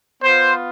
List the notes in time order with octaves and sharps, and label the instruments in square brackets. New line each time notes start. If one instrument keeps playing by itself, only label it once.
[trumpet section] B3 F4 C5